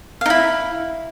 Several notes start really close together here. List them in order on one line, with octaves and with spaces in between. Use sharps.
F5 D#4 E4